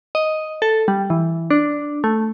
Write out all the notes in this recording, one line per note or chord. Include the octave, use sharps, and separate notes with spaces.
D#5
A4
G3
E3
D4
A3